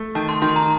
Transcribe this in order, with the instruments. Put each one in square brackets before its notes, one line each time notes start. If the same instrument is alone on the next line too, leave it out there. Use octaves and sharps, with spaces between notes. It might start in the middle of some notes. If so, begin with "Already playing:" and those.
Already playing: [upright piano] A3
[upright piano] D#3 [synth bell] A5
[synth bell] C6
[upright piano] D#3 [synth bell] C6
[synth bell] A#5